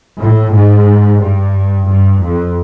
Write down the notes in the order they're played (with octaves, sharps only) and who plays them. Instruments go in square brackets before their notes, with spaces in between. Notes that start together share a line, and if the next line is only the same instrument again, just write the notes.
[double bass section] A2
G#2
G2
G2
F2